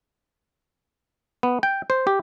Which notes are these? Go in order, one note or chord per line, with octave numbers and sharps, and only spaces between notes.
B3
G5
C5
G4